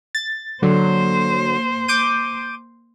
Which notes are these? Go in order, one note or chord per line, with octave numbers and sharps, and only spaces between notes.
A6
D3 F#3 A#3 C5
D6 G6 D#7